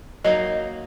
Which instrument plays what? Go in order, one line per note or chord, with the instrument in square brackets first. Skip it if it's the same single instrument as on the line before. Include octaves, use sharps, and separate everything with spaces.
[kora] F#3 A#3 D#4 [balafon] D#5